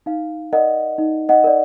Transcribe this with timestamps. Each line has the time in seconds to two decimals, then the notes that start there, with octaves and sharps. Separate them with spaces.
0.06 D#4 F5
0.53 A#4 D5 D#5 F#5
0.98 D#4
1.29 D#5 F#5
1.44 A#4 D5